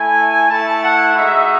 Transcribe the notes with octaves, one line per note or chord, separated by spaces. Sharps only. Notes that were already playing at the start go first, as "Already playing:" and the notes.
Already playing: A3 E4 G#5
A3 E4 A5
F#5
G#3 D#4 F#4 E5